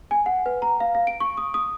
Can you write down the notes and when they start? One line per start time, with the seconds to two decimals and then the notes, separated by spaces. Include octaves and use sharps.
0.11 G#5
0.26 F#5
0.46 B4
0.62 A#5
0.80 F5
0.95 F5
1.07 D7
1.20 C#6
1.37 D#6
1.54 D#6